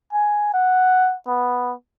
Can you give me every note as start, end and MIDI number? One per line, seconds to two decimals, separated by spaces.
0.13 0.50 80
0.54 1.15 78
1.27 1.73 59